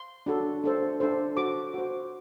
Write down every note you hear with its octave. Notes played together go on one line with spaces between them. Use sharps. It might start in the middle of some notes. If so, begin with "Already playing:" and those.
Already playing: C6
D4 F#4 A4
D4 A4 C5
D4 A4 C5
F#4 C5 D6
F#4 C5